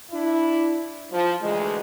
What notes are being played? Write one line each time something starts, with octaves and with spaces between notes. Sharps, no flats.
D4 E4
F3
D2 E3 G#3